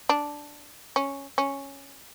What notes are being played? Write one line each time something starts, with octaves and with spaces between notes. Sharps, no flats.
D4
C#4
C#4